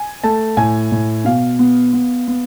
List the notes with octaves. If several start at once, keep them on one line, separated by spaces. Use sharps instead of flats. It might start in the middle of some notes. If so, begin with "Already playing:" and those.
Already playing: G#5
A3 A5
A2 G#5
A2
B2 F5
B3
B3
B3